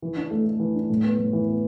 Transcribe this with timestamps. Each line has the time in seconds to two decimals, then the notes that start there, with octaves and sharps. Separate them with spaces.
0.02 E3
0.17 D4
0.31 A3
0.45 A3
0.60 E3
0.75 D4
0.90 A2
1.04 B3
1.18 A2
1.33 E3
1.48 B3